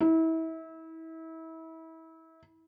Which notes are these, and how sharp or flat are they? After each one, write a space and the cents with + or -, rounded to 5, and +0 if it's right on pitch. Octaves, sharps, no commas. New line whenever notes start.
E4 -30